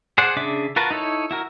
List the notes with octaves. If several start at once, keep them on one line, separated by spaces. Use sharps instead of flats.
G#4 C5 D5 F#5
C#3 D4 G#4 E5 D6
F4 F#4 A#4 B4 A5
D#4 E4 A4 C#5
E4 F#4 A#4